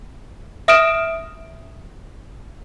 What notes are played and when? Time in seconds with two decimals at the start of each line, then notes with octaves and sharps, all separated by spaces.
0.68 E5 D#6 F6 D7 E7